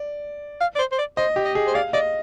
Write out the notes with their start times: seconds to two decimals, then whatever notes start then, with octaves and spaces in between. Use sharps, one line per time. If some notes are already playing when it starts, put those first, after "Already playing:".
Already playing: D5
0.61 F5
0.75 D5
0.79 C5
0.92 C5
0.98 D5
1.17 C5 D#5
1.36 G4
1.45 D#5
1.55 G#4
1.67 C5
1.75 D5 F5
1.93 D5 D#5